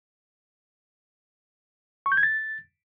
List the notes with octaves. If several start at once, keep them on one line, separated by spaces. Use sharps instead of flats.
C#6
G6
G#6
A6